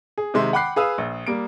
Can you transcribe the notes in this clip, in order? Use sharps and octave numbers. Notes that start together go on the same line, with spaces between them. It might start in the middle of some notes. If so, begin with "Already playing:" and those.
G#4
C3 D#3 G#3 E5 C6
F#5 G5 B5 D6 F#6 C7
G#4 B4 F5 D#6 E6
A#1
G3 A#3 D7